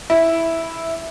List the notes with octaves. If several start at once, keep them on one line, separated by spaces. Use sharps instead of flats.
E4